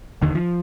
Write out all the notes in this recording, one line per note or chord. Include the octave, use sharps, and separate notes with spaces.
F1 D#2 D3 D#3
F3